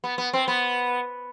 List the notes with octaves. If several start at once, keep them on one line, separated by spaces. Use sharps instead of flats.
B3
B3
C4
B3